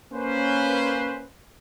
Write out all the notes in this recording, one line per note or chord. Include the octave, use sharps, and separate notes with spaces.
A#3 C#4 B4 C5